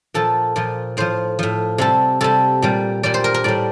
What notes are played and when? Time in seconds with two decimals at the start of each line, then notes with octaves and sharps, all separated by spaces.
0.14 A#2 F3 A4
0.56 A#2 F3
0.97 A2 F3 C5
1.39 A2 F3
1.78 C3 G3 A4
2.21 C3 G3 A4
2.62 A#2 G3
3.03 A#2 G3 D5
3.14 C5
3.24 A#4
3.34 A#4
3.44 A2 G3 D5